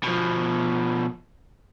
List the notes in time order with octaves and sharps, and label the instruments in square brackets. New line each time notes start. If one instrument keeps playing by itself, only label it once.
[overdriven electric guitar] B2 F3